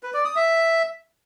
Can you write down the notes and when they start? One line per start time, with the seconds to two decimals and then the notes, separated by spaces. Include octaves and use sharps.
0.03 B4
0.14 D5
0.25 D#6
0.36 E5